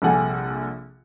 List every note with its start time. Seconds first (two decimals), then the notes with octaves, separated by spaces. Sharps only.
0.02 A#1 C3 G3 A4 F#5 G#5